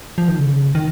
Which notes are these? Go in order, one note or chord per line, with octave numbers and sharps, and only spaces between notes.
F3
D#3
C#3
D#3